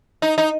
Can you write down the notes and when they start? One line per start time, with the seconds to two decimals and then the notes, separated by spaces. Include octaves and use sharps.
0.22 D#4
0.38 D#4